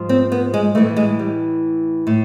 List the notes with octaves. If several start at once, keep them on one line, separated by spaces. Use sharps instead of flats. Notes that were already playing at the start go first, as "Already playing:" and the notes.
Already playing: G#2 F3
C4
B3
G#3
A2 E3 A3
G#3
G3
A2